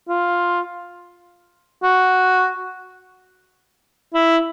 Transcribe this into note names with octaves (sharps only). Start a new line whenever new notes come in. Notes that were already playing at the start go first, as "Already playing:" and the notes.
F4
F#4
E4